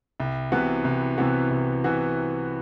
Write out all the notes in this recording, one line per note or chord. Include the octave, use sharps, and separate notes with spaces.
C2
C3 E3 B3 F#4
C2
C3 E3 B3 F#4
C2
C3 E3 B3 F#4